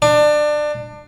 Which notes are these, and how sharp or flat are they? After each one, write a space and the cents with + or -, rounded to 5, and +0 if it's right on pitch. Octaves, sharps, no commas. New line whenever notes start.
D4 +25